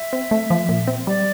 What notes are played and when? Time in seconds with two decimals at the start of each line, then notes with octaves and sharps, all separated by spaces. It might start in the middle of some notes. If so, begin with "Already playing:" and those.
Already playing: E5
0.13 C4
0.31 A3
0.50 F3
0.69 A#2
0.87 C4
1.07 G3 D5